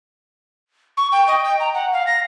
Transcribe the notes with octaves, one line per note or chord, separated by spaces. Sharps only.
C#6
G5
D#5
G5
A#5
F#5
F5
A#6